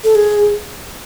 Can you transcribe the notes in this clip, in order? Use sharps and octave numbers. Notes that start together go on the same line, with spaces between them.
A4
G#4